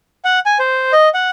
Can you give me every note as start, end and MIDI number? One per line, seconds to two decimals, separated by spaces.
0.25 0.39 78
0.46 0.58 80
0.59 0.92 72
0.93 1.09 75
1.14 1.30 78